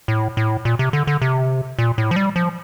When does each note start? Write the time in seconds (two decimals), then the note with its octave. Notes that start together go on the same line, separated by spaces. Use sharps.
0.08 A2
0.37 A2
0.65 A#2
0.79 C3
0.93 D3
1.07 D3
1.22 C3
1.79 A#2
1.98 A2
2.11 F3
2.16 G3
2.36 F3